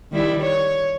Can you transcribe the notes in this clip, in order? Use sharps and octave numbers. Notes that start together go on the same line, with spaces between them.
D#3 G3 E4
C#5